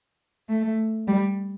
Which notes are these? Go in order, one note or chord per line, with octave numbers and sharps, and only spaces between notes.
A3
G3